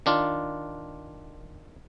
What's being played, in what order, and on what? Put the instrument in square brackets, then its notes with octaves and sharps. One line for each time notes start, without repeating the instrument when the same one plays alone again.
[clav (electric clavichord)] D#3 D4 F4